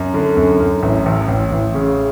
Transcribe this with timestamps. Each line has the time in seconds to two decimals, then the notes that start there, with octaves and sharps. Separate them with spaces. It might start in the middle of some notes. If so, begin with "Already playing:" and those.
Already playing: F#2
0.14 D3
0.37 F#2
0.60 F#2
0.83 A1
1.06 A1
1.28 A1
1.52 A1
1.75 C#3